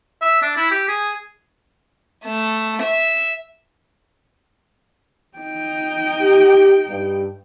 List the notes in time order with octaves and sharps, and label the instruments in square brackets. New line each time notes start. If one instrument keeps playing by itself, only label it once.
[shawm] E5
D4
E4
G4
G#4
[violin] A3
E5
[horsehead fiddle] D#4 G5
[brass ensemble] G4
G2